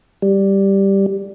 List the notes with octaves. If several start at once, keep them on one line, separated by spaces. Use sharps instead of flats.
G3